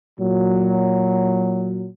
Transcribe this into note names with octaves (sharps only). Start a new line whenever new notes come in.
A#2 F#3